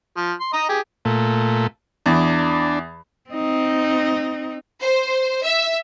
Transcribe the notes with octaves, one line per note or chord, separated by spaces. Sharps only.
F3
C6
D#5 A#5 D#6
G4 G#4
A#2 A3
E2 D4
C4 D#4
C5
E5